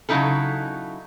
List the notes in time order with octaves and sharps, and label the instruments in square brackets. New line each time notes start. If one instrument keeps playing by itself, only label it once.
[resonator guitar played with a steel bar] C#3 F#3 D#4 E4 A4